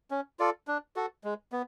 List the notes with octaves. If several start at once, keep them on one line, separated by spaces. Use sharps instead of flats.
C#4
F4 A4 D5
D4
F#4 A4
G#3
B3